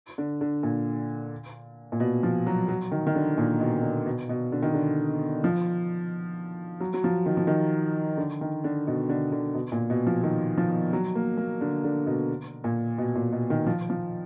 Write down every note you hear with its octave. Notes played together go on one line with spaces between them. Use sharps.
D3
D3
A#2
A#2
B2
F3
F#3
F#3
D#3
D#3
D3
A#2
B2
D3
B2
B2
D3
D#3
D3
F3
F#3
F#3
F3
D#3
F3
D#3
D3
D#3
D3
B2
D3
D3
B2
A#2
B2
F3
D#3
F3
F#3
A#3
A#3
D3
D3
B2
A#2
B2
A#2
B2
D#3
F3
F3